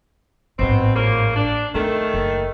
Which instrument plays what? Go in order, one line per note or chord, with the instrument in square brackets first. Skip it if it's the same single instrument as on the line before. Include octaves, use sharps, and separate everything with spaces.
[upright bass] A1 G#2 [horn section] B2 C4
[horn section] C#3 F3 A#3
D4
[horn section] D#3 A3 [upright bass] C4 D#4
[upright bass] F#1